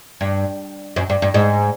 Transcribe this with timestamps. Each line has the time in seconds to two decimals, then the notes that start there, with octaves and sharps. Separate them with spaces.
0.21 G2
0.96 F#2
1.10 G2
1.22 G2
1.34 G#2